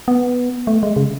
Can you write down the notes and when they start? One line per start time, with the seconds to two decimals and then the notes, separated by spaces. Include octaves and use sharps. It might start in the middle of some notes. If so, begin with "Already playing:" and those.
0.08 B3
0.67 A3
0.83 G#3
0.96 C#3